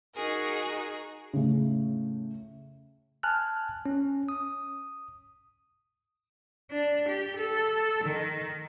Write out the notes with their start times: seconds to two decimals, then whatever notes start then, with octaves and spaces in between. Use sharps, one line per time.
0.15 D#4 F#4 G#4 A#4
1.33 A2 C#3
3.23 G#5 A5 F6 F#6
3.86 C#4
4.29 D#6
6.71 D4
7.08 G4
7.37 A4
8.04 D#3